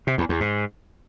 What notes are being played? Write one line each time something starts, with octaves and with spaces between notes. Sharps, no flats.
C3
E2
E2
G#2